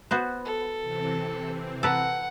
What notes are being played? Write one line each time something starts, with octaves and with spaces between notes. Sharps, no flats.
B3 F#4 C5
A4
C3 E3 C4
A4 B4 F#5 A#5